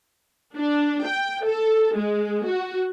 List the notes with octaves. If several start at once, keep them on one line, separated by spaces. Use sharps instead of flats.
D4
G5
A4
G#3
F#4